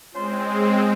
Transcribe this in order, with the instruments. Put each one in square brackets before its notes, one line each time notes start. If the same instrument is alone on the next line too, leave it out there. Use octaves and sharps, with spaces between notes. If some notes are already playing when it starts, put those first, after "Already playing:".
[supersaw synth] G#3 C4 [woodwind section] C#4 F4 C5